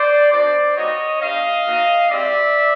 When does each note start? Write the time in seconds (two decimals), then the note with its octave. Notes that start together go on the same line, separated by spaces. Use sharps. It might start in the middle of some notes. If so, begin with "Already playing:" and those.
Already playing: C5 D5
0.31 B3 D4 F#4 C5 D5
0.76 G3 A#3 D#4 F#4 C#5 D#5
1.21 B3 D4 G4 D#5 F5
1.66 A#3 D#4 F#4
2.10 G#3 C4 E4 G4 D5 E5